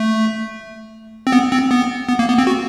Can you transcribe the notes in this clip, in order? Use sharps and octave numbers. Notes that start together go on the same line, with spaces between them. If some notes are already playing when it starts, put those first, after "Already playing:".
Already playing: A3
C4
B3
C4
B3
B3
A#3
B3
C4
F#4